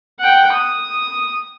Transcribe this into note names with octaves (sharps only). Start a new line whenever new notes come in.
F#5 G5
D#6